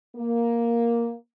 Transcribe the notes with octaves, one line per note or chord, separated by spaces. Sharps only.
A#3